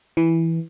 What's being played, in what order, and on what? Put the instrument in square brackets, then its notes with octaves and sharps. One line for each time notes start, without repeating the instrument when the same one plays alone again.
[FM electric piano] E3